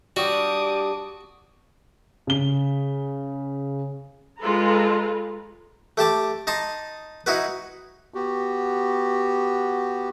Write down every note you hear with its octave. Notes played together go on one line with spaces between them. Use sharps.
G3 D4 F#4 D6 D#6
C#3 G7
G#3 F4 A4 B4 A#5
A3 G4 A5 D6
D#4 D#5 A5 C6
D#4 E4 F#4 B4
B3 F#4 G4